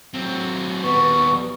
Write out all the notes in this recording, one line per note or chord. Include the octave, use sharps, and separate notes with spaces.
F#3 C4
D#2 G3 B3 C#6